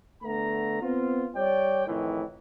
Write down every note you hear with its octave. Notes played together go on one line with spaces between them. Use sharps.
D3 A3 B3 A#5
B3 C4 F4
G3 C#5 D5 G5
F2 A2 D#3 E3